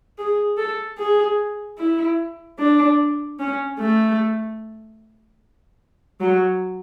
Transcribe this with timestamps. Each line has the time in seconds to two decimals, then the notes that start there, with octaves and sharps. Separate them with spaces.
0.18 G#4
0.58 A4
0.98 G#4
1.78 E4
2.59 D4
3.40 C#4
3.79 A3
6.21 F#3